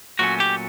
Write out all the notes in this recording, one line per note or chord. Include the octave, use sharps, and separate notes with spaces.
A#2 F#3 A3 C#4 F#4
G4